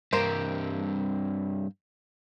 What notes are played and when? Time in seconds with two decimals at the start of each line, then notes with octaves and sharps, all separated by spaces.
0.13 G2 A#3 C4 G4 C5